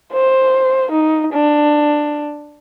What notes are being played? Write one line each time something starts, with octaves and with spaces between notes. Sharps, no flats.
C5
D#4
D4